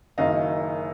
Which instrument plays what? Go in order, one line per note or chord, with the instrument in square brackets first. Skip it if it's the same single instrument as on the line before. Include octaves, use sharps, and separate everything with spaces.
[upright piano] F#1 F#2 D#3 D#5 F5